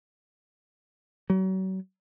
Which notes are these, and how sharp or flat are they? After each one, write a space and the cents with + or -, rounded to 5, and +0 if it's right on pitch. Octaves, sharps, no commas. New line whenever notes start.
F#3 +35